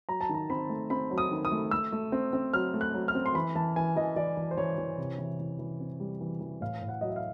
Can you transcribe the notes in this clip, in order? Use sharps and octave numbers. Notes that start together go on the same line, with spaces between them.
F#3 A#5
A5
D#3 A#5
C4 B5
A3
C4 B5
F#3
D#6
D#3
D#6
A3
A3 E6
A3
C4
C4
F#3 F6
A3
F#6
F#3
F6
C4
C6
E3 B5
E3 A5
E3 G#5
E3 D#5
E3 D5
E3
C5
E3 C#5
E3
C3
E3
E3
E3
C4
G3
E3
E3
A2 F5
A2
F#5
F#3 D#5
E5
F5